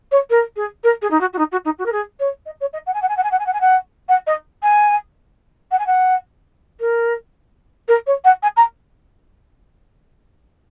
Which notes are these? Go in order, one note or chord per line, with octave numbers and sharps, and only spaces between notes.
C#5
A#4
G#4
A#4
G#4
D#4
F#4
F#4
D#4
F#4
D#4
F#4
A#4
G#4
C#5
D#5
C#5
D#5
F#5
G#5
F#5
G#5
F#5
G#5
F#5
G#5
F#5
G#5
F#5
F#5
D#5
G#5
F#5
G#5
F#5
A#4
A#4
C#5
F#5
G#5
A#5